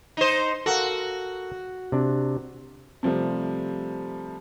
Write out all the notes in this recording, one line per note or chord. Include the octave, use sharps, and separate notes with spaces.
D#4 C5
F#4 A4 A#4 F5
C3 D4
C3 F3 G3 A3